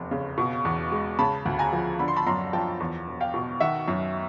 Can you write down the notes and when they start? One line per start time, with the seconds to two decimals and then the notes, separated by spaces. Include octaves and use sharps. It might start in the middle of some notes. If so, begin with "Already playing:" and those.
Already playing: F1 E2
0.11 C#3
0.38 B2
0.65 E2
0.92 G#3
1.19 C#3 A5 B5
1.46 D2
1.59 G#5 A#5
1.73 F3
1.99 D3 B5
2.08 C6
2.17 A5 B5
2.26 F#2 A#5 C6
2.53 F3 G5 A5
2.80 E2
3.07 E1
3.21 F5 G5
3.34 B2
3.60 D#3 E5 F#5
3.88 F#2